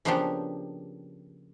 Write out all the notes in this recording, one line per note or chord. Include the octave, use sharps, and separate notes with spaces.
C#3 F3 A#3 B3 D4 G4